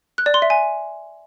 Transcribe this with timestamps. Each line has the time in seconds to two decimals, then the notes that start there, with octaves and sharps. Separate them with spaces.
0.18 F#6
0.26 D5
0.34 C6
0.42 E5
0.50 G#5